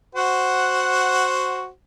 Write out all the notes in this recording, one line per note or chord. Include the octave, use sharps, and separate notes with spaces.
F#4 C5 F#5